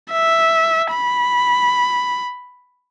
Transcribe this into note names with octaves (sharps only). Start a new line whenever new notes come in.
E5
B5